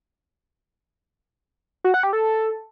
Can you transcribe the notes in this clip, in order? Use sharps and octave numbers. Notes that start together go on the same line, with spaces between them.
F#4
F#5
G4
A4